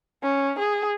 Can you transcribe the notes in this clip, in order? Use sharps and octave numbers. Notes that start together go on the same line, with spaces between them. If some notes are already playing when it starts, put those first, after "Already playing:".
C#4
G#4